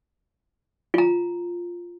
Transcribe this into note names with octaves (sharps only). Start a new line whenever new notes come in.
F4 A#5